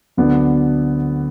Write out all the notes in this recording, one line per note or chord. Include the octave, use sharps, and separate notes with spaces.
D2 D3 F#3 B3